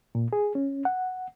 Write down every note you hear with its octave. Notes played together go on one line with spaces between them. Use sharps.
A#2
G#4
C#4
F#5